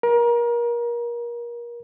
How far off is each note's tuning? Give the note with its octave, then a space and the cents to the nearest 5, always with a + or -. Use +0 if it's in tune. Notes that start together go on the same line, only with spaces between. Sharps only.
A#4 +30